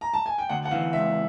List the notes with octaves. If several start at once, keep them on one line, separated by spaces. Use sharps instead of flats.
A#5
A5
G#5
G5
D2 F#5
F#5
E3 F5
C#2 E5